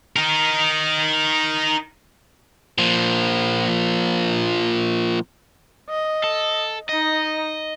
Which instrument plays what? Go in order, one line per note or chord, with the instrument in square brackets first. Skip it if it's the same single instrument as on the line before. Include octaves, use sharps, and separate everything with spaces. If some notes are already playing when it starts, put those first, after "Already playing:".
[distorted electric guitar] D#4 A#4
[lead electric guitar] A#2 F3
[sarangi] D#5
[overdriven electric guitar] A4
[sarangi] D#4 [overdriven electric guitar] D#5